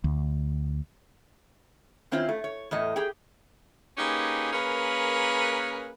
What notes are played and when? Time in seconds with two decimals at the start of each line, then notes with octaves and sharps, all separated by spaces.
0.04 D2
2.11 D#3 C4 C#4 E4 F4 C5
2.29 A3
2.44 C#5
2.71 E2 A2 D#5
2.96 G4 G#4 G5
3.98 A#3 C#4 D#4 G4 G#4 B4
4.53 A#3 C#4 G#4 A#4 B4